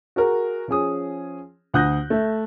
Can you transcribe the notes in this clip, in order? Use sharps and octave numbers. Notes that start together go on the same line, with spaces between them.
F#4 G#4 A#4
F3 C#4 G#4 D#6
D2 F#5 D#6 F#6 G6 A#6
A3 E5